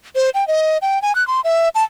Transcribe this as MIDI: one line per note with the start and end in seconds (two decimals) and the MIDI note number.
0.15 0.30 72
0.34 0.47 79
0.48 0.78 75
0.82 1.01 79
1.02 1.15 80
1.15 1.26 90
1.28 1.41 84
1.44 1.69 76
1.75 1.83 81